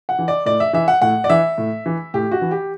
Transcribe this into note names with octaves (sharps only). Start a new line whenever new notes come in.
F#5
E3
D5
A2 D5
E5
E3 E5
F#5
A2 F#5
D5
E3 E5
A2
E3
A2 G4
F#4
E3
G4